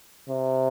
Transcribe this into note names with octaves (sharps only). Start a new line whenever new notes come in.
C3